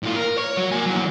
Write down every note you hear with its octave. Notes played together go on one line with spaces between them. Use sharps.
A2 F4
A#4
C#5
F#3
A#3 G#5
E2 F#3